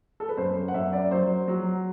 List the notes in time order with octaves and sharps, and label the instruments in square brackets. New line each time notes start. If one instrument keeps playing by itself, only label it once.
[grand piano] A4
B4
F#2 C5
F#5
F#2 E5
D5
F#3 C5
F#3